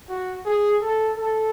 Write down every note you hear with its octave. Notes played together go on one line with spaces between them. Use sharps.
F#4
G#4
A4
A4